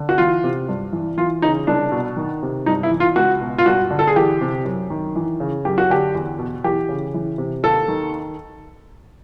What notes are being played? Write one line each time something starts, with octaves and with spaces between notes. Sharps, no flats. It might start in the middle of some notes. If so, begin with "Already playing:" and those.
Already playing: D3
F#4
E3 F4
C3
G2
E3
E3 F4
C#3 D#4
C2 D4
B2
D#3
C3
G2 D#4
E4
E3
F4
C#2 F#4
B2
F4
G2 F#4
D3
A4
G#4
E3 G4
C3
F#2
D#3
E3
C#3
F#2 G4
F#4
D3 G4
E2
B2
E3 G4
C#3
E3
C3
D#2 A4
D#3